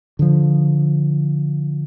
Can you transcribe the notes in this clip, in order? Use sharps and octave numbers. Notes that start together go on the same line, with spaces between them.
D3 F3